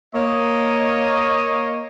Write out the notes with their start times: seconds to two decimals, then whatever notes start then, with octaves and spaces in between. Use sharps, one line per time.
0.15 A#3 C#5 D#5